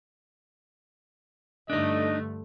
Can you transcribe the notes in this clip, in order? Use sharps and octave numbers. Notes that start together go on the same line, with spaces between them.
G2 D3 A3 D4 D#4 D#5